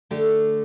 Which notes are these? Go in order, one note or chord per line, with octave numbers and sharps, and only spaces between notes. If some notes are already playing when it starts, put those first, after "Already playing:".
D3 A3 G4